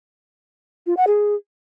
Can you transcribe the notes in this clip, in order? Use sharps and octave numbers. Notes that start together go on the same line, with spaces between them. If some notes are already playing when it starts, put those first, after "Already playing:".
F4
F#5
G#4